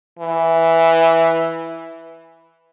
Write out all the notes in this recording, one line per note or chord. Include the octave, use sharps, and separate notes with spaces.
E3